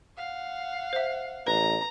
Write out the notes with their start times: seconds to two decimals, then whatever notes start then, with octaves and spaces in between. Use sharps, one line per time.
0.17 F5 F#5
0.93 C5 E5
1.47 A1 B4 A#5